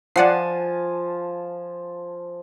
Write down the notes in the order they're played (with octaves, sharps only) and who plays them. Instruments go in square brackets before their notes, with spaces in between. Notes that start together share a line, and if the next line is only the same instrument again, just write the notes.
[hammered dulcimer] F3 G#5 A5 [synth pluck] D5 F#5 C7